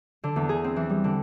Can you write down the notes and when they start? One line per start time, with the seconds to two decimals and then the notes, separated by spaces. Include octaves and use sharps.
0.24 D3
0.36 E2
0.49 G#4
0.64 C4
0.76 E3
0.89 G3
1.04 D3